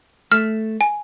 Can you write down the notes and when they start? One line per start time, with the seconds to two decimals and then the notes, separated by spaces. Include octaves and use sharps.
0.32 A3 F6
0.81 G#5